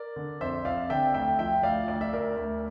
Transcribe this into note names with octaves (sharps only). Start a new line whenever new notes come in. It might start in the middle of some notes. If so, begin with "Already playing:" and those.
Already playing: A#4 D5
D3
F2 C5 E5
F2 D5 F5
D3 E5 G5
D2 E5 G5
F3 E5 G5
D2 D5 F5
D2 D5
E5
D2 A#4 D5
D2